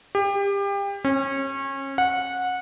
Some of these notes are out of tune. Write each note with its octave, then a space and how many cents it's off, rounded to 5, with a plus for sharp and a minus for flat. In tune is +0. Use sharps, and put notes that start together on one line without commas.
G4 +30
C#4 -30
F#5 -20